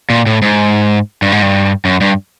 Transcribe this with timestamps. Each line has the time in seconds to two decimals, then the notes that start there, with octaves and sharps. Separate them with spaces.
0.10 A#2
0.26 A2
0.42 G#2
1.22 G2
1.32 G#2
1.42 G2
1.85 F#2
2.01 G2